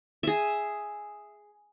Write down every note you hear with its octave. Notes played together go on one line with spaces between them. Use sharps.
G#4 E5